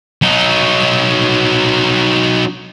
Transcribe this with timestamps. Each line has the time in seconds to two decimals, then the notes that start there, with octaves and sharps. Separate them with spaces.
0.22 F#3 D#4